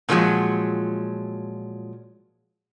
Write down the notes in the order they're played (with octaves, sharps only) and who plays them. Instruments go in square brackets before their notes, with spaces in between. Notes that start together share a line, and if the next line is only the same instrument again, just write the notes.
[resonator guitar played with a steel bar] A#2 D3 F3 F#3 G#3